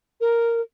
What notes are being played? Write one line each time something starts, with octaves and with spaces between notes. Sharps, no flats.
A#4